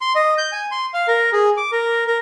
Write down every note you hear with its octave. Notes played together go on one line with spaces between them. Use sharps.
C6
D#5
G6
G#5
C6
F5
A#4
G#4
D6
A#4
A#4